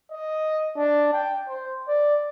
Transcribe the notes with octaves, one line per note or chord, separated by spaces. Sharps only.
D#5
D4
G5
C5
D5